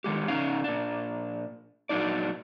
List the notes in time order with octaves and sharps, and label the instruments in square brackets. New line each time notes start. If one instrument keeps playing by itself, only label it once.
[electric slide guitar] D3 D#3 G#3 G4
C#3 C#4 D#4 F5
A#2 D4
A#2 F#3 D4 D#4 D5